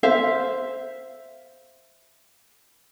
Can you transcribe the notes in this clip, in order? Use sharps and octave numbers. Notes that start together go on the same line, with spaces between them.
C5 E5 F5